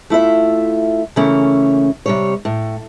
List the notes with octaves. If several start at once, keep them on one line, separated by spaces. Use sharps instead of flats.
A3 E4 F4 E5
C#3 E3 A3 A#3 C#4
C3 G3 C#5
A2